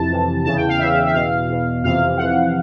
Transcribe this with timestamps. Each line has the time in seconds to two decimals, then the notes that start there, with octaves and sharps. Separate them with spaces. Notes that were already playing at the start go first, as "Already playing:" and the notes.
Already playing: F2 C3 E3 A5
0.10 F2 C3 E3
0.44 E2 C#3 E3 A5
0.56 G5
0.69 F5
0.79 E2 C#3 E3 E5
1.07 E5
1.14 E2 B2 F5
1.48 E2 B2
1.83 F2 C3 E3 F5
2.18 F2 C3 E3 F#5